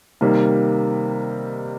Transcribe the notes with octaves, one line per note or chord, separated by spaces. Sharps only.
C3 D#3 G3 A#3